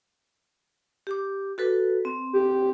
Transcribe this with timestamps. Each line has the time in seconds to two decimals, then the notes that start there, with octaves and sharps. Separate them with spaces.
1.07 G4 D6
1.58 F#4 A4 B4
2.05 C4
2.33 G4